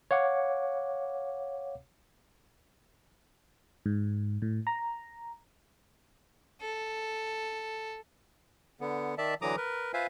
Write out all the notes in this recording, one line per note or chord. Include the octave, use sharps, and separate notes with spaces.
C#5 F5 F#5 D6
G#2
A2
A#5
A4
D3 B3
D#3 D5 E5 A5
D3 E3 F#3 A#5 D6 D#6
A#4 B4
F4 B4 C5 E5 F5 G#5